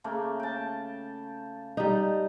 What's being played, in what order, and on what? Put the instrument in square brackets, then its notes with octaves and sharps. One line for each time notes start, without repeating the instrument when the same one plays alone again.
[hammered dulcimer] C#3 A3 A#3
G5 A5
[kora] G3 D#4